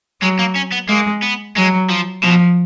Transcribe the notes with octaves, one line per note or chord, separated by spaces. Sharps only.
F#3 G#3
A#3
C#4
B3
G#3 A#3
B3
F#3 G#3
F3
B2 F3